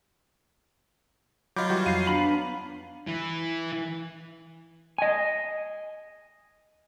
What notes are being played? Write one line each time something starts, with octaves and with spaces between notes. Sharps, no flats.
F#3 F4 D#5 B5 D6 G6
E3 G3 F#4
F2 F5 C7 D#7
B3 D4 A#5 B5
E3
D#5 G#5